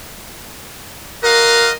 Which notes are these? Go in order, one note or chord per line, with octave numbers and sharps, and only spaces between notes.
F#4 A#4 D#5 F5